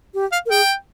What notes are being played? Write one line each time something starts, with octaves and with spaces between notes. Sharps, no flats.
G4
F5
A#4
G#4 G5